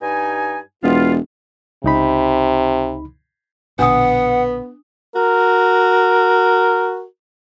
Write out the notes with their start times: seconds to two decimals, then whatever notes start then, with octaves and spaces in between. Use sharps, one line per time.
0.01 G2 D#4 G#5
0.83 E1 B3 F4
1.84 C#2 C3 D#4 B5
3.79 A#1 B2 D3 B3 D4 F#5 D#6
5.15 F#4 A#4